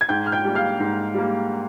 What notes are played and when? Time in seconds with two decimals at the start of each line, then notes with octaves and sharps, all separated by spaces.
0.01 G#6
0.09 G#2 G5 G6
0.26 F6
0.32 G5 G6
0.45 G3 A#3
0.55 F5 F6
0.80 G#2
1.14 G3 A#3